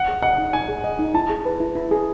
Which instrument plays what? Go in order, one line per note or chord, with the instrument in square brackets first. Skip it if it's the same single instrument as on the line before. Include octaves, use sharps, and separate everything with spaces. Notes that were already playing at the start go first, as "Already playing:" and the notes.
Already playing: [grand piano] F#5
[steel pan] G#4
[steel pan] D#5 [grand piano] F#5
[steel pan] D#4
[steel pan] D#4 [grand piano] G#5
[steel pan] G#4
D#5
D#4
[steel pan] E4 [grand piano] A5
[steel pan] G#4
B4
E4
E4
G#4